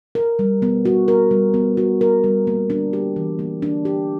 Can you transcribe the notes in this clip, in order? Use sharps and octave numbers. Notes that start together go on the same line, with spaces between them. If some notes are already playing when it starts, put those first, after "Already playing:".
A#4
G3
B3
F#4
A#4
G3
B3
F#4
A#4
G3
A#3
D4
G4
E3
A#3
D4
G4